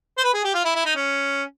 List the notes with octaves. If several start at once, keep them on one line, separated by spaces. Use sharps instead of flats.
C5
B4
G#4
G4
F4
E4
E4
D#4
C#4